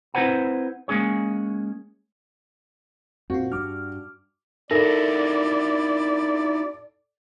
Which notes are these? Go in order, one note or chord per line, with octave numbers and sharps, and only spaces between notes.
C4 E4 B4 C5 F#5 A#5
G#3 A#3 C#4 G#4 C#5
F#2 A#2 C4 F4 F#4
G2 G3 D4 D6 F6
D#4 E4 F#4 A4 A#4 D5 A#6